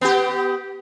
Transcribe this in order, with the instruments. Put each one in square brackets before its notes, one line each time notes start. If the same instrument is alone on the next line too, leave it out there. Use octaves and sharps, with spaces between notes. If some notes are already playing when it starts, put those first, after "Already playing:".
[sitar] B3 G4